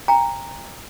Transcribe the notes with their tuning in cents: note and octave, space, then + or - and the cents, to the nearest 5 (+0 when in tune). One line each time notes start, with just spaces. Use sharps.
G5 +35 A#5 +0